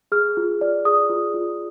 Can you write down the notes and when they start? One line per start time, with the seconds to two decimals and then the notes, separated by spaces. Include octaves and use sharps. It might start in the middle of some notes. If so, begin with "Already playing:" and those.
0.12 G#4 F6
0.37 F4
0.61 D5
0.85 G#4 D#6
1.10 F4
1.34 F4